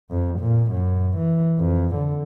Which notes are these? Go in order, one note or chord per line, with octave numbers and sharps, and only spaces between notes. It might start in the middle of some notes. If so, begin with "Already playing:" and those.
F2
A#2
F#2
E3
F2
D3